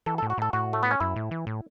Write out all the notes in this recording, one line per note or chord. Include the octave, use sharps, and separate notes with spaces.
E3 A4
A4
A2
F#4
A2 A4
A2 F#4
A3
B3
C#4
F#2 E4
A2
E3
A2